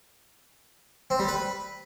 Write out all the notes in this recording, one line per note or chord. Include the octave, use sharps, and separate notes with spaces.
C4
G3
B4